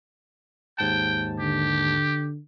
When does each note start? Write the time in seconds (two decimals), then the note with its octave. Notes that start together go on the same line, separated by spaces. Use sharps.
0.78 D#2 G#2 G5 A5
1.39 D3 G4